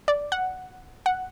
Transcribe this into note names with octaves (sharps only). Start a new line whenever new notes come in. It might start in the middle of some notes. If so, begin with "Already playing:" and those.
D5
F#5
F#5